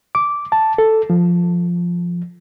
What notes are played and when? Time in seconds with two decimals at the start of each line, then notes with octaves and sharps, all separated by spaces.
0.15 D6
0.52 A5
0.78 A4
1.10 F3